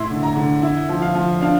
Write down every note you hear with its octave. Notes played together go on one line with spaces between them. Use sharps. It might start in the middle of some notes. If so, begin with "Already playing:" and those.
Already playing: A2 E4 C6
D3
A#5
D3
E4
F3
F5
F3
D4 F5